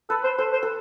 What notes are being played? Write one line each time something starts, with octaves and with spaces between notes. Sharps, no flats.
A4 B4
C5
A4 C5
C5
A4